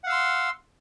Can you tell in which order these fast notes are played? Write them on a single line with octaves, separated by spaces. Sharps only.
F#5 F5 E6 C6